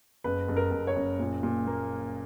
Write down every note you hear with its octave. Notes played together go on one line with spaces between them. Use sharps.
F#1 B4
F#1
A#4
F#1
C#5
F#1
A#2
A#2
A#3